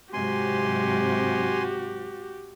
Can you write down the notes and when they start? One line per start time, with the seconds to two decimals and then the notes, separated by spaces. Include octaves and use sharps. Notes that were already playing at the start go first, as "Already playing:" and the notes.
0.13 G#2 C3 F#3 F#4 G4 G#5 C6